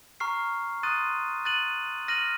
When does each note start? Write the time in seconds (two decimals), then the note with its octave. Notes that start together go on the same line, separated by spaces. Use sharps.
0.20 A#5 C#6 F6 C7
0.83 C6 D#6 F#6 A6 D#7
1.45 F#6 A6 D#7 F#7
2.08 F6 A#6 D#7 F#7